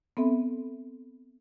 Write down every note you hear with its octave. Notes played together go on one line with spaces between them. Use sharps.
B3 C4 A4 E5 B5